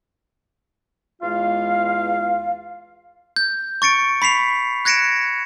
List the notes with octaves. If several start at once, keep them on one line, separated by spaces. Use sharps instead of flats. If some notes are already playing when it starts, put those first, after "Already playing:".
E2 G#3 F4 F5
G6
C#6 A6 C#7 D7
B5 B6 C7 F7
F#6 G#6 A#6 C#7 D7 E7